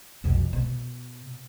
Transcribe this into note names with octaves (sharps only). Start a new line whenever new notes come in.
B1 F2
B2